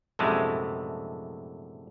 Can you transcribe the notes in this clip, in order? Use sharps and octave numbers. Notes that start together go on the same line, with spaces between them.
A#1 F#2 A2 C3 G#3 A3